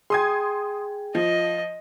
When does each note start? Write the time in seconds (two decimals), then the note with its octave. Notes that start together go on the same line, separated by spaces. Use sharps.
0.10 G#4 G5 C6 D#6 G#6
1.15 F3 D#5